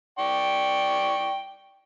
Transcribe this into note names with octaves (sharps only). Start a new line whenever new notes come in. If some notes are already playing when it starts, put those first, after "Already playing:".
D5 G5 C#6